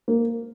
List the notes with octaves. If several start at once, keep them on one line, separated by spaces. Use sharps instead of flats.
A#3